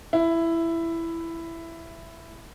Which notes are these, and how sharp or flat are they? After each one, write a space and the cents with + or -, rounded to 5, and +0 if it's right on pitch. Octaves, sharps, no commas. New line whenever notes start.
E4 +10